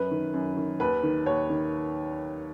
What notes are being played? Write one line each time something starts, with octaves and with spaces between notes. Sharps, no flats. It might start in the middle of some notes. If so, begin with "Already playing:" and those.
Already playing: F#2 B4
D#3
F#2
D#3
D#2 B4
D#3
D#2 C#5
D#3